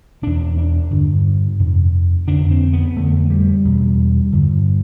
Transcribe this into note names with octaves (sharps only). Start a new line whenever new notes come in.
E2 B2 D4
D4
G2 D3
F2 C3
F2 D3 D4
C4
B3
F2 D3 A3
G3
E2 B2
G2 D3